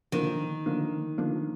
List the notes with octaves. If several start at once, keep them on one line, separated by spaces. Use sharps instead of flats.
D3 D#3 F3 A#3 D4
D3 F3 A#3 D4
D3 F3 A#3 D4